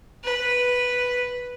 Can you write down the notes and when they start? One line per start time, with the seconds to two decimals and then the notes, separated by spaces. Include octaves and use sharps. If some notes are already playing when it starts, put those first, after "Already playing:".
0.24 B4